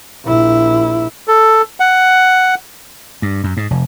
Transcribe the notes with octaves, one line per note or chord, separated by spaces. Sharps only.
A#1 E4
A4
F#5
G2
F#2
G#2
F1